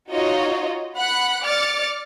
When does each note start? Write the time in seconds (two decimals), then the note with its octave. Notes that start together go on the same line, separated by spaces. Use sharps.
0.11 D#4 F4 F#4 C#5 D#5
0.97 F#5 B5 F#6
1.42 D5 D6 F6 A6 C#7